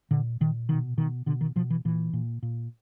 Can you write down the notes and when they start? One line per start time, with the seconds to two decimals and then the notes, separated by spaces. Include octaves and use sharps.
0.11 A#2 D3
0.41 A#2 D#3
0.69 B2 D#3
0.97 B2 D#3
1.26 B2 D3
1.41 D#3
1.56 B2 F3
1.70 E3
1.85 A#2 E3
2.13 A#2
2.43 A#2